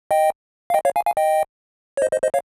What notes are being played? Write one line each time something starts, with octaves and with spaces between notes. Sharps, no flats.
D#5 G5
F5
D#5 G5
C#5 F5
F5 G#5
F5 G#5
D#5 G5
C#5
C5 D#5
C5 D#5
C5 D#5
C#5 F5